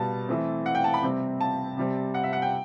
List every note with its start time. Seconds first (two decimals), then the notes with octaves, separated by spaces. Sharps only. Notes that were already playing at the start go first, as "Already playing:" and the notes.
Already playing: B2 G3 B3 A5
0.28 E3 A3 C4
0.66 F#5
0.75 G5
0.84 A5
0.94 B5
1.03 C3 G3 C4
1.41 A5
1.77 C3 G3 C4
2.14 F#5
2.23 E5
2.33 F#5
2.42 G5